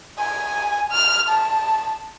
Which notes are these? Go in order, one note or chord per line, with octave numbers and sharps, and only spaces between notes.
G#5
F6
A5